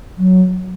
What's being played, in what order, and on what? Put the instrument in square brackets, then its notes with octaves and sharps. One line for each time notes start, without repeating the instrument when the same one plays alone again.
[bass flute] F#3